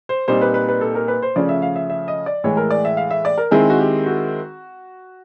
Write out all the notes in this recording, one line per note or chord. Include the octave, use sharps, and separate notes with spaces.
C5
A#2 G3 C4 D#4 C5
B4
B4
B4
A4
A#4
B4
C5
C#3 F3 A3 C#4 D5
E5
F5
E5
E5
D#5
D5
A2 E3 G#3 C#5
A#4
D5
E5
F5
E5
D5
A#4
D#3 G#3 C4 E4 G#4
F#4
G4
F#4